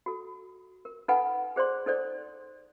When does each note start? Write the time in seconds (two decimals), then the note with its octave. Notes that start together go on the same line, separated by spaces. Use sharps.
0.06 F#4 A4
0.85 A#4
1.08 D#4 A4 B4 F#5 G#5 B5
1.56 G#4 C5 D5 C6
1.86 D#4 A4 C5 D5